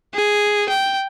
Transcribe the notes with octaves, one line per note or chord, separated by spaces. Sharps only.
G#4
G5